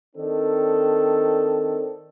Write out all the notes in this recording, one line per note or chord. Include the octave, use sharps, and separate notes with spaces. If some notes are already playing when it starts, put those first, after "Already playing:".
D#3 C4 D4 A4